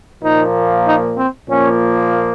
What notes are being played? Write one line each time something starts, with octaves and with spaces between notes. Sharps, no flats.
A#2 F3 A#3 D#4
D#4
C4
A#2 F3 A#3 C#4